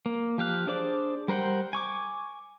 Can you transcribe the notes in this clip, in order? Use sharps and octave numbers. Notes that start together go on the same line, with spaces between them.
A#3
F3 G4 F5 F#6
D4 G#4 C5 D5 D6
G3 A#4 C5 F#5 G5
G#5 C#6 D6